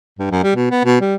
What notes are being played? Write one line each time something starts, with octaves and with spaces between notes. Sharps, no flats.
G2
F#2
G3
B2
B3
B2
G3